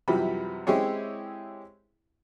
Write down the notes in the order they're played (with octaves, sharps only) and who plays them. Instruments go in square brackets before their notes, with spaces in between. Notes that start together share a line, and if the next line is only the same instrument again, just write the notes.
[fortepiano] F#2 C3 E3 F3 G3 B5
G#3 C4 E4 G4 G#4 C#5